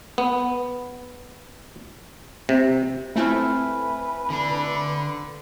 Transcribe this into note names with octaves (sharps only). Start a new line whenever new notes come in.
B3
C3
A3 C4 E4 B4 E5 G#5 F6
D3 D4